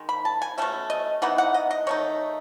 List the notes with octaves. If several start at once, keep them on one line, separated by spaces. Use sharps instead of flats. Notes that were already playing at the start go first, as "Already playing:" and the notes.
Already playing: D#3 G#3
B5
A5
G#5
B2 A3 C#4 E5
D#5
E3 B3 D#4 F#5
F#5
D#5
D#5
D#3 A3 D#4 C#5